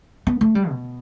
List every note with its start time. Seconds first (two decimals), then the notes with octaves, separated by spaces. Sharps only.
0.27 B3
0.41 A3
0.55 G3
0.69 B2